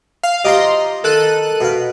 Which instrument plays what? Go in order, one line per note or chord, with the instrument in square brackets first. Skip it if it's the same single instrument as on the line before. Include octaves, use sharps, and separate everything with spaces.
[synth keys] F5
[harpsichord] F3 G4 [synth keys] D#5 A#5 C6
[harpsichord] D#3 [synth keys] A4 F#6 D#7
[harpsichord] B2 F5